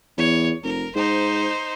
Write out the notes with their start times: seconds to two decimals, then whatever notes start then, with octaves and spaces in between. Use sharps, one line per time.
0.18 E2 C#5
0.63 F1 A#4
0.95 G#2 D#4 C5